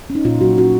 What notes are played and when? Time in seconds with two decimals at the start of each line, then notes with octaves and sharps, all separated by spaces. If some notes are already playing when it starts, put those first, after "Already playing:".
0.10 C#4
0.15 D#4
0.25 A#2 F4
0.41 F#3 F#4
0.58 C#4 F#4